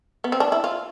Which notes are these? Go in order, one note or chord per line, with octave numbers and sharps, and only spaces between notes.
B3
C4
D4
E4
F4